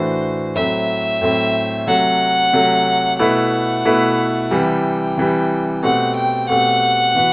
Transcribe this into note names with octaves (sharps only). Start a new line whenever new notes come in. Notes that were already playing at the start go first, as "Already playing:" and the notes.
Already playing: A2 E3 A3 D4 F#4 C5
A2 F#3 A3 C4 E5
A2 F#3 A3 C4
C3 F#3 A3 F#5
C3 F#3 A3
B2 A3 E4 B4 F#5
B2 A3 E4 B4
C3 E3 G3 G5
C3 E3 G3
B2 A3 C4 G4 F#5
G5
B2 A3 C4 G4 F#5
E3 B3 F#4 B4